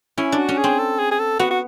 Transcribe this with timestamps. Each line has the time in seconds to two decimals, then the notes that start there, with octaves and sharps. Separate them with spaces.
0.18 C#4 E4
0.32 D4
0.38 F#4
0.49 C#4
0.58 G#4
0.64 C4
0.79 A4
0.99 G#4
1.11 G#4
1.19 A4
1.39 B3 F#4
1.51 F#4